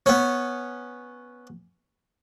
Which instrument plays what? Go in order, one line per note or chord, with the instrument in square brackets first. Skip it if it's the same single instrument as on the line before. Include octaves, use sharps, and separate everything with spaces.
[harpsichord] B3 C#4